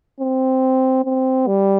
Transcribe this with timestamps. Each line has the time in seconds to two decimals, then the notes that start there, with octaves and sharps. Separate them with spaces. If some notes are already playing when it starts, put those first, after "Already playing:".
0.20 C4
1.05 C4
1.47 G3